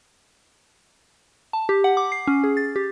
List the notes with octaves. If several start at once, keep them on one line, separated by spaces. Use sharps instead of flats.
A5
G4
F#5
D6
C7
C#4
G#4
A6
G4